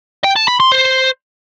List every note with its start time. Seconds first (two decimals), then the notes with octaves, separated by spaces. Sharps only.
0.24 G5
0.36 A5
0.48 B5
0.60 C6
0.72 C5